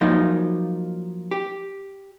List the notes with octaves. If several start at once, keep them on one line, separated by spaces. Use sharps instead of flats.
F3 F#3 A#3 D#4 F4
G4